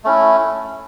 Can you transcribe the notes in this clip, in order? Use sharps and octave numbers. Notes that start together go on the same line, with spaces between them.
A3 C#4 E4